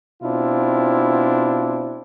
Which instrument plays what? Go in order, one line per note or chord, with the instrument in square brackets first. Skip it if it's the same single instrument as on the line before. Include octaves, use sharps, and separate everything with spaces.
[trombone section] B2 C4 D4 E4 F4